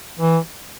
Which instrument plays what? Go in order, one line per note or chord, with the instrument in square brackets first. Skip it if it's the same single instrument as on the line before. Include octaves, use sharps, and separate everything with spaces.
[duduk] E3